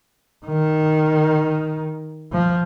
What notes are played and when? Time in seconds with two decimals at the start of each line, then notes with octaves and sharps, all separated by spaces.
0.46 D#3
2.32 F3